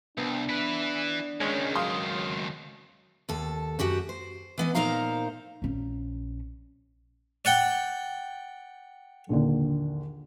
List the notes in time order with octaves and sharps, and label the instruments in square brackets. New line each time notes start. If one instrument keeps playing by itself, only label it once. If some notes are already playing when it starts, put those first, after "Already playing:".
[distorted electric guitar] C2 [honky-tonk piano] B3 [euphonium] D4
[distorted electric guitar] E4 B4
[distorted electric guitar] C#2 D#3 [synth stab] G#3 C#4
[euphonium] F#3 [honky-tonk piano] F5 C6 D#6
[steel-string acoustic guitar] D#2 A4
F#2 F#4 G4 F#5
C5
E3 B3 D#5
A#2 D#4 A#4 C5 F5 A#5
[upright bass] A#1 C#4
[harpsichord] D5 F#5 G5
[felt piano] A#1 D#2 D3